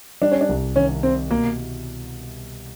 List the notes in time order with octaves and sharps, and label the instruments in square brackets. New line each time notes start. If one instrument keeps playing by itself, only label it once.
[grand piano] G3 [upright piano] D4
[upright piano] C#4
D4
[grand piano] C2
[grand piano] D#3 [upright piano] C#4
[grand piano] C3 [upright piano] C4
[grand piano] B2 [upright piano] A#3